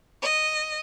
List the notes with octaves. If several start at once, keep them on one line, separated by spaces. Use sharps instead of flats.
D#5